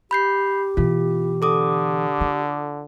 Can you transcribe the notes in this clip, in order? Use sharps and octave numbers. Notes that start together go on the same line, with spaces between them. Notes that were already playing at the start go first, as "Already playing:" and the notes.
G4 B5 G6 C7
B2 E3 F4
D3 A4 D6 D#6
F4